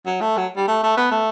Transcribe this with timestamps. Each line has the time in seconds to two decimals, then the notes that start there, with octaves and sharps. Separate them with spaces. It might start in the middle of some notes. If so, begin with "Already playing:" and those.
0.06 F#3
0.21 A3
0.37 F#3
0.57 G3
0.68 A3
0.83 A3
0.97 B3
1.11 A3